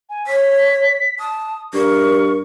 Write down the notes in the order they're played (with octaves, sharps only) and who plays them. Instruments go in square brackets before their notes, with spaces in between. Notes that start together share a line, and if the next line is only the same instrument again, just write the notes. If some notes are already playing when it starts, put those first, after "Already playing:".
[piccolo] G#5
[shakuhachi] C#5 [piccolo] B6
[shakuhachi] A5 [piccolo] D#6
[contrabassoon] G2 [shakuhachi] A#4 [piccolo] C#6